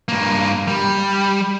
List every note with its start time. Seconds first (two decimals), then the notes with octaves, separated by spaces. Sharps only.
0.09 G2 A#3
0.68 G3